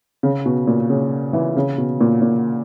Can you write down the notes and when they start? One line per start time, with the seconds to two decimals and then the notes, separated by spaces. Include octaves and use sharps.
0.23 C#3
0.46 B2
0.67 A#2
0.90 C#3
1.33 E3
1.56 C#3
1.78 B2
2.01 A#2
2.22 A#2